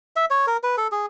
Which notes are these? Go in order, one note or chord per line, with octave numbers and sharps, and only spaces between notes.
E5
C#5
A#4
B4
A4
G#4